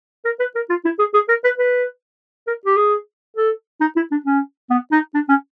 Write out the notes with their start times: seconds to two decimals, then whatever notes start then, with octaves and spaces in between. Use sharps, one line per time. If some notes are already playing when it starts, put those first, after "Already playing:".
0.25 A#4
0.39 B4
0.55 A#4
0.69 F4
0.85 E4
0.99 G#4
1.14 G#4
1.28 A#4
1.44 B4
1.58 B4
2.47 A#4
2.65 G4
2.76 G#4
3.37 A4
3.81 D#4
3.96 E4
4.11 D4
4.26 C#4
4.70 B3
4.92 D#4
5.14 D4
5.29 C#4